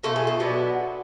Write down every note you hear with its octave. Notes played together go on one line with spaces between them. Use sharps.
B2 A3 F4 A4
G#4
A4
B2 F#3 B3 D4